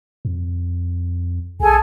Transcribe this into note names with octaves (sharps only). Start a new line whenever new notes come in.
F2
B1 G#4 A4 G#5